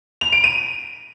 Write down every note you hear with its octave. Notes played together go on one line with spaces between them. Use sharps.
F7
D7
D#7